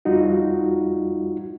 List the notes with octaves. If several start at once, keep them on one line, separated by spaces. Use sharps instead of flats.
F2 G3 D#4 F4 F#4